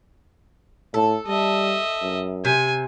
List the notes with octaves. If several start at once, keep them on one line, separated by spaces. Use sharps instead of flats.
A2 A4
G3 D#5 E5
F#2
C3 G#5